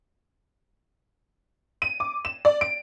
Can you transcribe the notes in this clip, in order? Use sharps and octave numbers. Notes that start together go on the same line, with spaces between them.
D#7
D6
E7
D5
D7